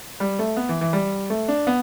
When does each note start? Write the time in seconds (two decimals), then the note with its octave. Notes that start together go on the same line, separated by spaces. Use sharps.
0.20 G3
0.39 A3
0.57 B3
0.69 E3
0.81 E3
0.93 G3
1.30 A3
1.48 D4
1.67 B3